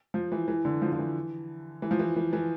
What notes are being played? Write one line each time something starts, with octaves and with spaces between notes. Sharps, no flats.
F3
E3
E3
D3
F3
F3
E3
E3
F3
E3
E3
E3